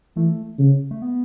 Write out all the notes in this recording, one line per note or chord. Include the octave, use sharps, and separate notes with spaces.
E3 A3
C#3
A3
B3